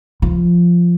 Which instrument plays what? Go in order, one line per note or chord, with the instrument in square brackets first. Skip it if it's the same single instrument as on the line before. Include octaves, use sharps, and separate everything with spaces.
[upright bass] F3